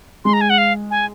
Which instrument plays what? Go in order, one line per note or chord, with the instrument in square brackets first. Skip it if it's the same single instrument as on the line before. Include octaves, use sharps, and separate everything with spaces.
[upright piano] G#3 [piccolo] C6
[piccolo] A#5
G#5
F#5
F5
G#5